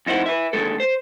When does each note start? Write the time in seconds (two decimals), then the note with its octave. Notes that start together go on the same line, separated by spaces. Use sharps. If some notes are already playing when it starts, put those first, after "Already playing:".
0.06 F2 D#4 E4 C5 F#5
0.26 B4 E5
0.53 D#2 D3 G#3 A4
0.80 C5